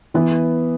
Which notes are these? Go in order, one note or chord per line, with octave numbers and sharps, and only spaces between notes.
E3 B3 E4 B4